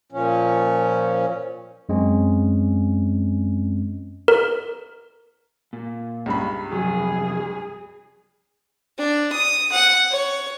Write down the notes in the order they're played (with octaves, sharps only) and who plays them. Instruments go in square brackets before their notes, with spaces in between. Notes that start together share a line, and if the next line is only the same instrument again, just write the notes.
[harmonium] A#2 F3 C#4
[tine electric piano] F#2 G#3 C4 C#4
[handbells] A#4
[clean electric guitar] A#2
[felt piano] C#2 G2 B5
[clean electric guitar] C2 F2 F#3 [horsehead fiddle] G#4
[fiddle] D4
D#6
F#5
C#5